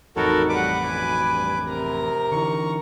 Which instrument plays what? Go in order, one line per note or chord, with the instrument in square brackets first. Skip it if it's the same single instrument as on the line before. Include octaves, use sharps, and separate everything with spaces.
[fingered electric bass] A1 F2 [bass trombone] D#4 [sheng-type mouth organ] F#4 A4 A#4 [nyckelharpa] C#5 B5
[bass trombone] G3 [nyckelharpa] A4 F#5 [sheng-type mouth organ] B4 D6
[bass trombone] B1 [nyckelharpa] G#5 B5
[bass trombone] G2
[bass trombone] C3 [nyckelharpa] A#4 A#5
[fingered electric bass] D3 E3 [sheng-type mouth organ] C#6